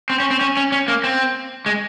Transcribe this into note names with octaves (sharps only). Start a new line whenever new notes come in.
C4
C#4
C4
C#4
C#4
C#4
A#3
C4
G#3